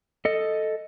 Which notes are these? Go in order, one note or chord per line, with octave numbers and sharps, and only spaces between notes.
A4 D#5